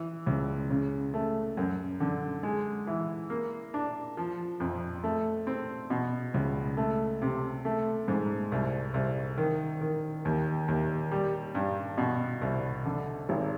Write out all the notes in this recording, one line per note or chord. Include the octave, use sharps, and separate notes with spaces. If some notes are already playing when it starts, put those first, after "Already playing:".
Already playing: E3
C#2
C#3
A3
F#2
D3
G#3
E3
A#3
D4
F3
F2
A3
C4
B2
C#2
A3
C3
A3
G#2
C2
C2
D#3
D#3
D#2
D#2
G3
G2
B2
C2
D3
G#1